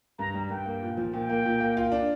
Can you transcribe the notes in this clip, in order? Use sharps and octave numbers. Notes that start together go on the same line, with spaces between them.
G2 A#5
G3
G2 G5
A#3
A#2
F3
A#2 G5
A#3
A#2
A#3
F4
D4